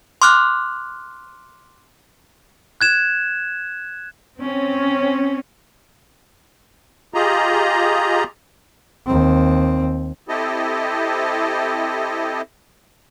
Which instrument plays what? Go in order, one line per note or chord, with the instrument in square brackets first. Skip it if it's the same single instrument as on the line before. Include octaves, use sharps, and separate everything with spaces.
[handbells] C6 D6 F6 F#6
[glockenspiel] F#6 G#6 E7
[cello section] C4 C#4
[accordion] F4 G4 G#4 D#5 A#5
[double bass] D#2 C4
[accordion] C4 E4 G4 A4 D#5